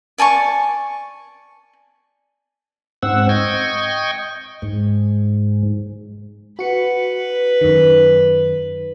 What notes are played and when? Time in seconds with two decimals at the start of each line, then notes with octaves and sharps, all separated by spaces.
0.18 D5 G#5 A5 C#6
3.03 G#2 C4 F#5 E6
3.29 D#5 G5 C#6 G#6
4.62 G#2
6.59 F#4 B4 C#7
7.61 F#2 D#3